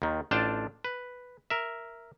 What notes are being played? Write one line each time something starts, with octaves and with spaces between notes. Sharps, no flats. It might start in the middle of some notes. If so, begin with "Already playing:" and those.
D#2 D#3
A1 D4 F4 G5 A5
B4
A#4 E5